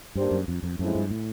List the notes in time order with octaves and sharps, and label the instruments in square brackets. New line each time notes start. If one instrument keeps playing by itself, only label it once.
[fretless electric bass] G2 [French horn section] G3 A#3 D4 G4 C5
[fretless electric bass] F#2
F2
F2
[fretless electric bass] F#2 [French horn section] A2 F3 G#3 C4 E4
[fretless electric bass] G2
A2